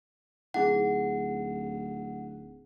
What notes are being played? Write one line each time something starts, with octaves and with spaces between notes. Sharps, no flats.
D1 D#4 E4 G#4 F#5